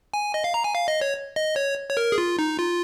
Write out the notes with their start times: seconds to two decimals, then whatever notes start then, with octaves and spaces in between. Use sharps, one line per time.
0.14 G#5
0.34 D#5
0.44 F5
0.54 A#5
0.64 G#5
0.75 F5
0.88 D#5
1.01 C#5
1.36 D#5
1.56 C#5
1.90 C#5
1.97 A#4
2.12 G#4
2.18 F4
2.39 D#4
2.59 F4